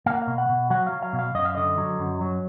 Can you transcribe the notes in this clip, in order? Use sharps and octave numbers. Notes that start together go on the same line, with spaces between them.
A#3 F5
F#5
F5
B2
F#5
B2
F#3 F#5
F5
F#3
F5
B2
F5
F#2 D#5
F5
D3 D#5
F#3
F#2
F#3